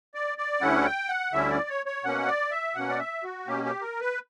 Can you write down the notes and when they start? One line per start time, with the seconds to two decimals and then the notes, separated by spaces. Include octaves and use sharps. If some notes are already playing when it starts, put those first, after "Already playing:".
0.14 D5
0.38 D5
0.61 D2 D3 G3 C#4 E4 F#5
0.86 G5
1.09 F#5
1.32 D2 D3 G3 C#4 E4 E5
1.51 D5
1.69 C#5
1.86 C#5
2.04 B2 A#3 C#4 F#5
2.27 D5
2.51 E5
2.75 B2 A#3 C#4 F#5
2.90 D5
2.99 E5
3.23 F#4
3.47 B2 A#3 C#4 G4
3.65 G4
3.82 A#4
4.01 B4